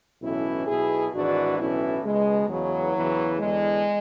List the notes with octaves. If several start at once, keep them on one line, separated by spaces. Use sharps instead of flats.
B1 A2 E3 C#4 E4
B1 B2 E4 G#4
G#1 G#2 E3 D4 F#4
B1 A2 E3 C#4 E4
C#2 B2 G#3
E2 C#3 E3 F#3
E2 C#3 E3
E2 D3 G#3